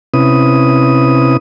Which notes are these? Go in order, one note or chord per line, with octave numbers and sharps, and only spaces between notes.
C3 C#4 E4 B4 D#6